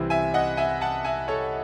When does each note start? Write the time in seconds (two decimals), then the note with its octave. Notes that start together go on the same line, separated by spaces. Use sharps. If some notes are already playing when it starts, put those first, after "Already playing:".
Already playing: C2 C3 E3 C4 E4
0.10 E5 G#5
0.34 D#5 F#5
0.57 E5 G#5
0.81 F#5 A5
1.04 E5 G#5
1.28 A4 C#5